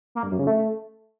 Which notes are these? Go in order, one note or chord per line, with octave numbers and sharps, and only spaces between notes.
A#3
G2
F#2
C#3
A3